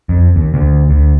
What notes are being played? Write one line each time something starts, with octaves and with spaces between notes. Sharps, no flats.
F2
D#2
D2
D2